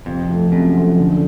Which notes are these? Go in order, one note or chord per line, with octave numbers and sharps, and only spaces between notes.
F2 C3
F3 A3
F#2 C3
F3 A3
D3